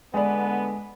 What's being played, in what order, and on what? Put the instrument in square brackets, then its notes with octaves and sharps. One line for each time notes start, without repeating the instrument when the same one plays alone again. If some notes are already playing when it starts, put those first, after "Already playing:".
[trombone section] D3 B3 [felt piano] G#3 D5